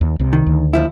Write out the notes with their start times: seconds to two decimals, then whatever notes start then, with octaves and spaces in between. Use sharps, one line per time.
0.01 D#2
0.19 C2 C3
0.33 D#3
0.46 D2
0.73 D#2 F3 E4